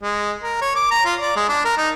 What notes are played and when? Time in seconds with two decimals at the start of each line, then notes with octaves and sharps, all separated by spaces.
0.03 G#3
0.43 A#4
0.62 C#5
0.76 D6
0.91 A#5
1.05 F4
1.20 D5
1.36 G#3
1.49 D4
1.65 A#4
1.78 D#4